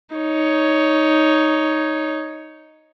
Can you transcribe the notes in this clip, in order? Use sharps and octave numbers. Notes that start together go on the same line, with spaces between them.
D#4 C#5